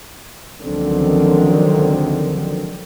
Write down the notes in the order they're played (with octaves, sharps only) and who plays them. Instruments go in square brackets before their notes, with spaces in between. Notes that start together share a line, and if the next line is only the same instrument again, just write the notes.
[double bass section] C#2 D3 D#3 F3 F#3 C4